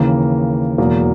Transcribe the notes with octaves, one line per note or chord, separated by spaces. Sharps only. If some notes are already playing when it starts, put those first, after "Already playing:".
Already playing: D#2 C#3 E3 A#3
E1 E2 B2 F#3 A#3